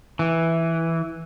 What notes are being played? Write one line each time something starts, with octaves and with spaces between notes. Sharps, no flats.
E3